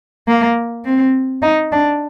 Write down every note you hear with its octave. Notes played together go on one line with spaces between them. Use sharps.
A#3
C4
D#4
D4